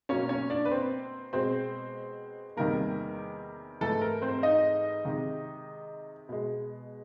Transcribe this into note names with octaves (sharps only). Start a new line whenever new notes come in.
B2 F#3 A#3 C#4 C#5
C#4 C#5
D4 D5
B4
C4 C5
B2 G#3 C4 C5
E2 C3 D#3 G3 A#3 A#4
G#2 E3 A3 A4
A#4
C4 C5
D#4 D#5
C3 D#3 G#3
B2 G#3